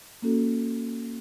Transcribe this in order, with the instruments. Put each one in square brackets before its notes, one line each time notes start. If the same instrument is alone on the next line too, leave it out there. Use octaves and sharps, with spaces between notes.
[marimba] A#3 C#4 F#4 A4